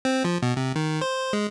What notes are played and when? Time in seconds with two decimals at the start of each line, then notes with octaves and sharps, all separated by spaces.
0.05 C4
0.25 F3
0.42 B2
0.57 C3
0.76 D#3
1.01 C5
1.33 G#3